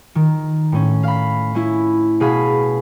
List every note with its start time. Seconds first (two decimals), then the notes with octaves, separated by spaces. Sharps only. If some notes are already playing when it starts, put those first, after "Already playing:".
0.15 D#3
0.72 A2 C#4
1.03 F5 B5
1.55 C#4 E4
2.20 B2 G#4 F5 B5